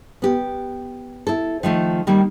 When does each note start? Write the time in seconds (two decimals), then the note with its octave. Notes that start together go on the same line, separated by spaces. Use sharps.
0.22 B3 G4
1.27 E4 A4
1.63 D#3 F3 A3 D#4
2.07 D#3 G3 A#3